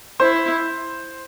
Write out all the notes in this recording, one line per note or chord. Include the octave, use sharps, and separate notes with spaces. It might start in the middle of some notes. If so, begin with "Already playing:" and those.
E4 C5